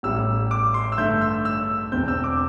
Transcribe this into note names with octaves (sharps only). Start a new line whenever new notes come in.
A1 A2 G3 E6
D6
C6
E6
G2 D3 A3 G6
E6
E6
E1 E2 D3 C4 G6
E6
D6